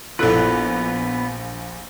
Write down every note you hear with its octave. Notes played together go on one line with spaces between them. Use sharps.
A#1 B3 E4 A4 B4 D5 F#6